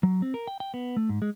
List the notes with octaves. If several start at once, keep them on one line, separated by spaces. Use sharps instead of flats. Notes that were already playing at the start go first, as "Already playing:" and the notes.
F#3
C4
A#4
G5
G5
B3
A3
G#2
G#3